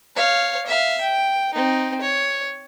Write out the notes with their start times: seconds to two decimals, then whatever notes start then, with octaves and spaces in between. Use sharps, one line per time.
0.16 C#5 F5
0.66 E5 F5
1.01 G5
1.54 C4 D#4
2.01 C#5